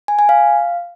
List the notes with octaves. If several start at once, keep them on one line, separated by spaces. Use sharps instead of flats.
G#5
G#5
F5